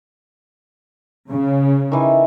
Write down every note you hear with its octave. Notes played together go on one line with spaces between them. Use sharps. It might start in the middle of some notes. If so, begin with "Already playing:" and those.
C#3
D#3 E3